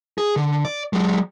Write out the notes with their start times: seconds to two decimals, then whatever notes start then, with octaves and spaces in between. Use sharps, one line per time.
0.18 G#4
0.36 D3
0.65 D5
0.93 F#3 G#3